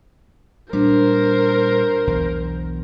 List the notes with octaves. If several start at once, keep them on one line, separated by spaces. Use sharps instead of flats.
A#2 G3 D4 A#4 C5
B1 E2